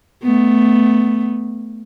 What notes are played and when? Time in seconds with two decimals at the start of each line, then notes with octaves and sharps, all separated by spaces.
0.23 A3 B3